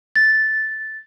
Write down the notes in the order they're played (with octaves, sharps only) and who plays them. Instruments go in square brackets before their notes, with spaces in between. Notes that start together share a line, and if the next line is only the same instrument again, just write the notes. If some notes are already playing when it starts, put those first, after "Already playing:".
[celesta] A6